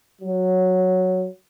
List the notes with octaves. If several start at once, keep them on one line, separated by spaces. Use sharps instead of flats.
F#3